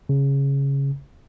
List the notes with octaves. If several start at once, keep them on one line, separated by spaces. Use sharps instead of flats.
C#3